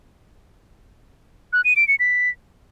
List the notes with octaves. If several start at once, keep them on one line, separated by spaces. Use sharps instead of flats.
F#6
D#7
D7
C#7
B6